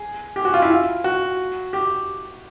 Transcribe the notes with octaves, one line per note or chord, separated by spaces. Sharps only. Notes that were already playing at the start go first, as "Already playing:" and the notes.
Already playing: G#4
G4
F#4
F4
E4
F4
F#4
G4